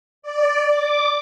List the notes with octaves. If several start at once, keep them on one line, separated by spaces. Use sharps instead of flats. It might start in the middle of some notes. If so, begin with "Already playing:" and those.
D5
D6